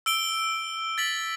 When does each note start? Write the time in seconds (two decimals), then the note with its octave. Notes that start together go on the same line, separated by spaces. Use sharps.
0.06 E6 D7 G7
0.98 A6 B6 F#7